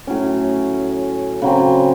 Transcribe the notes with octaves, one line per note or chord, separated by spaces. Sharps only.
A2 F#3 C#4
C#3 F#3 C4